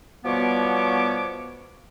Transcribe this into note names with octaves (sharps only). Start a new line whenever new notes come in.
B2 F3 G3 B3 C#5 D6